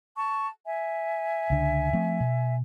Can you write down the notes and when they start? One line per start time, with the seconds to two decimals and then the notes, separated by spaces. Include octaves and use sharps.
0.17 A5 C#6
0.66 E5 G#5
1.50 C#2 D3
1.93 F3 A3 C4
2.20 B2